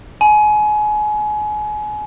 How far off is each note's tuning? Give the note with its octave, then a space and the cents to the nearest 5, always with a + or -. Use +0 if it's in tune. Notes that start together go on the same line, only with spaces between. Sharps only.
G#5 +30 B5 +0